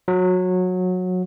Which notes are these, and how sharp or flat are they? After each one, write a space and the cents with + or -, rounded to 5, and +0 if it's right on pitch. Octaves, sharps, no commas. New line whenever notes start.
F#3 -20